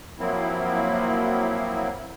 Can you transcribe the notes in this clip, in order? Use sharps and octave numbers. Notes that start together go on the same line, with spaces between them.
F3 F#3 A#3 C4 E4